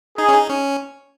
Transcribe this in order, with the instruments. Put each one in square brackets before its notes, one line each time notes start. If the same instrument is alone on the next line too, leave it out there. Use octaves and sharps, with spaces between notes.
[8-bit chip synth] D#4 [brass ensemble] G#4
[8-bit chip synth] C#4
D#4
C#4